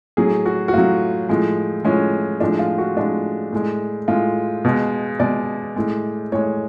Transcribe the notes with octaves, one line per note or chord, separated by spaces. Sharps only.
A2 F#3 G#4
F#4
F#4
A2 F#3 F4
A2 F3 G#3
A2 F3 G#3 C#4
A2 F3 G#3 D4
F4
F#4
A2 F3 G#3 D4
A2 G#3
A2 G#3 F4
B2 G#3
B2 G#3 D5
A2 G#3
A2 G#3 C#5